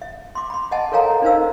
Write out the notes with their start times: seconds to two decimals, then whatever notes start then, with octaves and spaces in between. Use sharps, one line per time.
0.02 E5
0.35 C6 D6
0.50 B5 C6
0.71 D#5 E5 F#5 G#5 A5
0.92 A4 A#4 C#5 F5 G#5 A#5
1.22 D4 D#4 A#4 C5 F5 E6